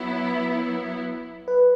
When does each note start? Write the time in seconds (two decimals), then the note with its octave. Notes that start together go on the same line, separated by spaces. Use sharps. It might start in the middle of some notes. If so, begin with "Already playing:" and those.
Already playing: F#3 B3 E4
1.48 B4